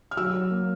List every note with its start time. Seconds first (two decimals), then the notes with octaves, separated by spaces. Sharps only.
0.11 F6
0.17 F#3 E6
0.34 F#3
0.51 A#3